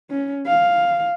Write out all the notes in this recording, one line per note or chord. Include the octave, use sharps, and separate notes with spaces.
C#4
F5